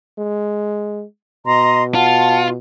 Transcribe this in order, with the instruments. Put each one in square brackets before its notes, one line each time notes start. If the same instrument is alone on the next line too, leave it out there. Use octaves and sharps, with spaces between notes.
[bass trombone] G#3
[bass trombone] B2 [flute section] D#5 A#5 C6
[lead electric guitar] F4 [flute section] F#5 [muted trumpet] A5